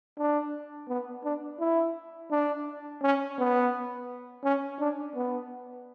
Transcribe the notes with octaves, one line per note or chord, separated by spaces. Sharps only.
D4
B3
D4
E4
D4
C#4
B3
C#4
D4
B3